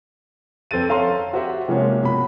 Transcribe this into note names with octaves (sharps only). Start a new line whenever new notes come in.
F2 C4 A4 B4 A6 D#7
C#4 A4 F5 A#5 C6
F#4 G4 C5 E5 F#5
C3 F3 G#3 A#3 C#4
B2 B5